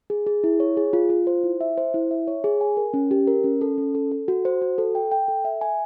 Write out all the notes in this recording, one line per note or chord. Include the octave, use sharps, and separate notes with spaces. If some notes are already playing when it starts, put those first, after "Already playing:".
G#4
G#4
E4
C#5
G#4
F4
F4
C5
E4
E5
C5
E4
E5
C#5
G#4
G#5
A#4
C#4
G4
A#4
C#4
A4
C#4
A4
A4
F#4
C5
F#4
A4
G5
G5
A4
E5
G#5